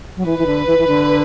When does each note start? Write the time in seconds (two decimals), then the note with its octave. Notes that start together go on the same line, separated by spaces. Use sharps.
0.17 F#3
0.26 E3 B4
0.39 E3
0.46 D3
0.67 E3
0.78 E3
0.87 D3